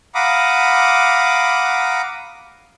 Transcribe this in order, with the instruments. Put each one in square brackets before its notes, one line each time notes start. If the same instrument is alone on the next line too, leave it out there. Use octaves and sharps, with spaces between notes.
[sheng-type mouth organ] F5 F#5 A#5 B5 D6 D#6